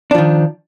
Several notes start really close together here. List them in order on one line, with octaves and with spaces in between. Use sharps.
D4 F3 D#3